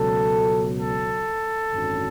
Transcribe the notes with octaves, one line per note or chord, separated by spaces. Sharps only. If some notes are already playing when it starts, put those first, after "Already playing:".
Already playing: C#2 B2 F#3 A4
A4
G#1 F#2 D3 F#3